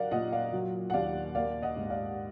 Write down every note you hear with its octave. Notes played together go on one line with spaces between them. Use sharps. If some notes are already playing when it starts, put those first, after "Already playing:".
Already playing: F#3 A#4 D5 F5 F#5
A#2 D#5 F#5
D5 F5
F#3
F#5
D#2 D5 F5
A#3 D5 F5
D#5 F#5
G#2
D5 F5